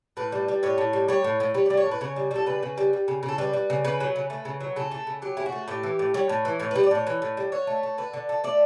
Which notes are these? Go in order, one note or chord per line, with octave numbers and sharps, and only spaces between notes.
A2 B4
G3
G3
A2 C#5
A2
G3
G3 C#5
A2
A2
G3 C#5
G3 D5
C#5
A2
B4
C#3 C#5
G3
G3 A4
C#3 B4
C#3
G3
G3
C#3
C#3
A4
G3 B4
G3
C#3
C#3 B4
F#3
C#3
A3
C#3
F#3
C#3 A4
A3
C#3
F#3 G4
C#3 E4
F#4
A3
A2 G4
E3
A2
G3 C#5
A2
E3
A2 C#5
G3 B4
D5
A2 C#5
E3
A2
G3
D3 C#5
A3
A3
D3 B4
D3
A3
A3 D5